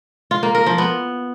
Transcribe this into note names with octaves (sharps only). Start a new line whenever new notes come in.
F4
A#3
A#4
F3
B3